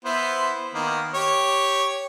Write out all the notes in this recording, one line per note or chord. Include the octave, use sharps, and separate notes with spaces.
B3 E4 C5
D#3 A#3 B3
G4 C#5